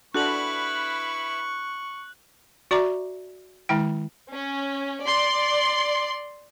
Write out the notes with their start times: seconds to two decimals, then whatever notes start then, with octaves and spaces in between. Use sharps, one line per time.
0.14 D4 E4 F#4 A4 B4 C#6 F#6 F#7
2.71 F#4 D5 E5 A#5 D6
3.69 D#3 G#3 E4 G5
4.32 C#4
5.07 D5 C6